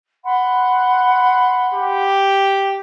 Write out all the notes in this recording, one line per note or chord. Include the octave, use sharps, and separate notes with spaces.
F#5 B5 C6
G4